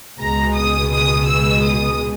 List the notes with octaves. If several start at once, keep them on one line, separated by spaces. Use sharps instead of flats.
C#2 B2 G#3 A#5
D#6
D#6
E6
D#6